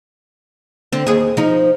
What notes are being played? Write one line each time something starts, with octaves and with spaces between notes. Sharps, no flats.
D3 C4
D#2 G#4
F3 D#4